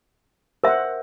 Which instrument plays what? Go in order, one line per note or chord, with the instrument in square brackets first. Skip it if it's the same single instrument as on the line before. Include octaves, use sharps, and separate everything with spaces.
[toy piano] A#4 E5 [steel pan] C5 F#5